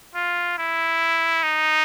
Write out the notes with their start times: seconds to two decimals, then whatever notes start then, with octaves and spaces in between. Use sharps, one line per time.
0.15 F4
0.58 E4
1.43 D#4